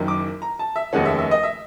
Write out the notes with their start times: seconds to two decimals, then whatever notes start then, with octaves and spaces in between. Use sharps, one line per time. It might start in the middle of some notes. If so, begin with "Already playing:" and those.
Already playing: F#1 F#2 D#3
0.08 D6
0.42 A#5
0.59 A5
0.76 E5
0.93 F1 D#2 D#3 G#3 C#4 F#5
1.05 E5
1.19 E5
1.31 D#5
1.43 E5